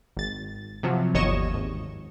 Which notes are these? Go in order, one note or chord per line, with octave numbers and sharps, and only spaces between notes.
G#1 A6
C3 F3 F#3
G1 D#2 C#5 D#5 C#6 E7
G#1